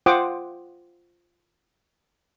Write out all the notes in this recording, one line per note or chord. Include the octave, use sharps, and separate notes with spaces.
F4 C5 F#5 G5 D6 D#6